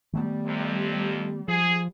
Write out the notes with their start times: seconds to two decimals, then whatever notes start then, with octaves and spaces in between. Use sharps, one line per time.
0.13 D#3 G3 A3 B3
0.46 F2 C3
1.48 F3 G#4